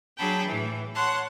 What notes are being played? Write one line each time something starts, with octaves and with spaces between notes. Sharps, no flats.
F#3 D4 G#4 G5 A5 B5
A2 E3
C#5 F#5 A5 C6